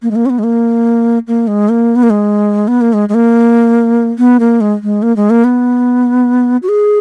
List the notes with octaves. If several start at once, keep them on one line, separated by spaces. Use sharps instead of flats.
A#3
G#3
A#3
C#4
B3
G#3
A#3
A#3
G#3
A#3
B3
A#3
G#3
B3
A#3
G#3
G#3
A#3
B3
A#3
G#3
G#3
A#3
G#3
A#3
B3
F#4
G#4